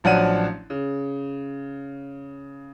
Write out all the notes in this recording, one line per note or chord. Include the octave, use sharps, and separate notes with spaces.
A1 F3 F#3 D4 F#5 D#7
C#3